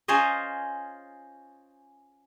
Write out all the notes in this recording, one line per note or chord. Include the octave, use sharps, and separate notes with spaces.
C#4 F4 G#4 C5 C#5 D#5